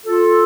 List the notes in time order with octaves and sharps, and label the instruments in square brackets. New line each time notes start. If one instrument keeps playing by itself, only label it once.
[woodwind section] F4 A4